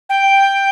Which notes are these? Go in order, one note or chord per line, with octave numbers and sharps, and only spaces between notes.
G5